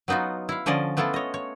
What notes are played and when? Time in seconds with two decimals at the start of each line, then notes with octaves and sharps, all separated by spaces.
0.08 F#3 B3 D#4 F4 F#4
0.49 E4 F5
0.66 D3 F3 C#4 D5 D#5 G#5
0.97 A3 B3 E4 F4 A4
1.14 C#5 D#5
1.34 C#5